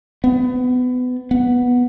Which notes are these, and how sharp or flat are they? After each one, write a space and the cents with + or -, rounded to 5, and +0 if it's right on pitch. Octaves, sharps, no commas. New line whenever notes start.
B3 +25
B3 -5